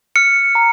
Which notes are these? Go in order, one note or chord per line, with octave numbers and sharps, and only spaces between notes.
F6 C#7
A#5